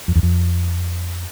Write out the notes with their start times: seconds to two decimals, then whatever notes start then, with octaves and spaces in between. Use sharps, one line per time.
0.08 F2
0.16 E2
0.23 F2